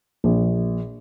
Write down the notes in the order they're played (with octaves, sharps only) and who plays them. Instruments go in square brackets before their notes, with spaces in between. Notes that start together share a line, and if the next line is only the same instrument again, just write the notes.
[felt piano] A#1